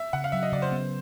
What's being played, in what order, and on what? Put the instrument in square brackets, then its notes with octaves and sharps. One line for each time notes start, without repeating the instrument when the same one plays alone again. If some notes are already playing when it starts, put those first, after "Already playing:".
Already playing: [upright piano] E5
[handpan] C#3 [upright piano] F#5
[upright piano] F5
[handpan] F#3 [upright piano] E5
[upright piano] D#5
[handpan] C#3 [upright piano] D5
[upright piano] C5
[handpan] B3